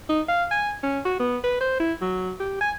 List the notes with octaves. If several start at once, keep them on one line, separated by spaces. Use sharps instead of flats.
D#4
F5
G#5
C#4
F#4
B3
B4
C5
E4
F#3
G4
G#5